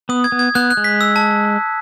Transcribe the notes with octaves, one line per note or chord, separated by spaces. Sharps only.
B3 D#6
G#6
B3
G#6
B3 F#6
F#6
G#3
B6
E6
A5